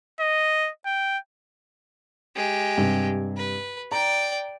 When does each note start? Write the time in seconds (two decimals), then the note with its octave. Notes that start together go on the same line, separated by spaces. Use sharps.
0.20 D#5
0.85 G5
2.36 G#3 G4
2.78 G2 C3
3.37 B4
3.92 D5 G5 A#5